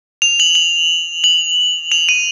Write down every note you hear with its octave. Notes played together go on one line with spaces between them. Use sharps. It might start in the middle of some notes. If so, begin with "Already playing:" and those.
F7
F#7
F#7
F#7
F7
D#7